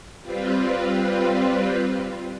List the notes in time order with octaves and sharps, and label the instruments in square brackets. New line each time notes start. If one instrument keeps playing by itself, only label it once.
[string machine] G3 C4 F4 B4